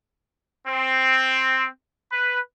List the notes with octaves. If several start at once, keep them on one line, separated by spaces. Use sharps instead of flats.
C4
B4